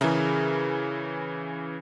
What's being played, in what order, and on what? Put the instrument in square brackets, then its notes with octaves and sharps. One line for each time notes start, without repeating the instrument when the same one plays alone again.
[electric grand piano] C#3 E3 [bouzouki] E4 G#4 A#4